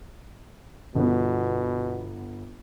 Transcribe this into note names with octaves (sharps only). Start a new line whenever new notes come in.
G1 B2 B3